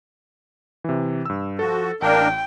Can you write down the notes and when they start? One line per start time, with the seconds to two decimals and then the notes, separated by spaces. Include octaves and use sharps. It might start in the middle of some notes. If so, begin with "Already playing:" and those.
0.84 C3 E3
1.26 G2 E6
1.59 F3 F#4 A4
2.02 A1 A#3 D4 A#4 G5